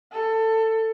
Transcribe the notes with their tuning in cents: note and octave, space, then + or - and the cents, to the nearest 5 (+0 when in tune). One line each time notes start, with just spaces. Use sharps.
A4 +20